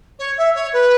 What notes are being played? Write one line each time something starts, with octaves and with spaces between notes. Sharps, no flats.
C#5
E5
C#5
B4